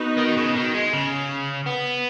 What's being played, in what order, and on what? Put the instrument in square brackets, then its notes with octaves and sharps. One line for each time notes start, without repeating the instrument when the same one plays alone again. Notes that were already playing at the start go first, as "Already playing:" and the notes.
Already playing: [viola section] B3 D#4 F#4 B4
[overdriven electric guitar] D#3
C#3
D#3
G#3
C#3
B3